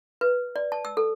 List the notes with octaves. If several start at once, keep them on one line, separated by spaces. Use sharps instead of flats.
B4
D5
A5
E6
A4